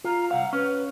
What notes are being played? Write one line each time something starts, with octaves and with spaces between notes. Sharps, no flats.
F4 A#5
C2 F5 F#5
C#4 B4